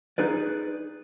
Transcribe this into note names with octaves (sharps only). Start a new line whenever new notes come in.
D#4 G#4 B4 D5